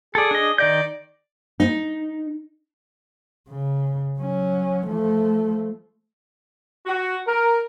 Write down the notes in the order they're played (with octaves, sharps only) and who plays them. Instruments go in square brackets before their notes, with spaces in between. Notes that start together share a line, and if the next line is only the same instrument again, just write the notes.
[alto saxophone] G#4 [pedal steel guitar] A4 D5
[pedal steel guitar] D4 D#5
[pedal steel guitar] D#3 D#5 G6 [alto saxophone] D5
[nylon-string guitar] D#4
[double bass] C#3
F#3 C#4
F3 A3
[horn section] F#4
A#4